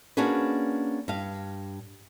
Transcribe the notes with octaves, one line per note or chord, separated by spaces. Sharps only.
A#3 C#4 D4 F#4 G#4 B4
G2 F5